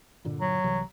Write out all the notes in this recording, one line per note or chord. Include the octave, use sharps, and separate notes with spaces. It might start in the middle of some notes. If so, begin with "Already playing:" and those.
G2 A#2 D3
F#3
C2 C3 E3